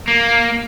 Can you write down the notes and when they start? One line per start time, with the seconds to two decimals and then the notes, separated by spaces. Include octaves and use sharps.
0.08 A#3